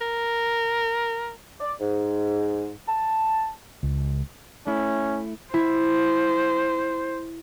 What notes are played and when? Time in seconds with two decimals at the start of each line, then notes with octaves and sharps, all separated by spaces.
0.01 A#4
1.60 D5
1.80 G#2
2.87 A5
3.83 C#2
4.67 A3 C#4 E4
5.54 E4 C5